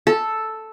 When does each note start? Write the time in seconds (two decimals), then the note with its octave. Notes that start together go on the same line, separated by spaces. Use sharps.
0.07 A4